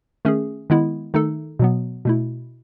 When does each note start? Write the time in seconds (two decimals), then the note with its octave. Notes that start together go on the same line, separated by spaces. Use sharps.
0.25 D#3 A3 C#4 G#4
0.70 D#3 G#3 B3 E4
1.14 D#3 A3 D#4 A4
1.59 B2 F#3 B3
2.05 B2 A3 E4